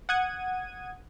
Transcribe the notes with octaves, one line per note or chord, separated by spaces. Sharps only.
F#5 D#6 G#6 D#7